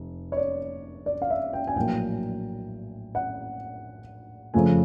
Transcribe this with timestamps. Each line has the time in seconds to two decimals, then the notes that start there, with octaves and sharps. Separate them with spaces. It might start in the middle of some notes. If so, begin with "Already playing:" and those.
Already playing: F1
0.32 C#5
0.37 D5
1.06 D5
1.22 F5
1.30 E5
1.53 G5
1.68 G#5
1.75 A#1 A2 F#3 A#3 G5
3.15 F#5
4.54 F2 C#3 F3 A3 G#5